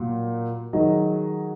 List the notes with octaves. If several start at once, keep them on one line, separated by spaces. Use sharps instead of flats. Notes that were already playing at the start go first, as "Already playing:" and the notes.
Already playing: A#2 F#3
D#3 F#3 D#4 G#4 D#5